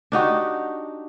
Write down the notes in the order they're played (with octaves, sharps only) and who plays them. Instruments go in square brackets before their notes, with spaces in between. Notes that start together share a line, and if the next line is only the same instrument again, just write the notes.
[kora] D4 D#4 F#4 G4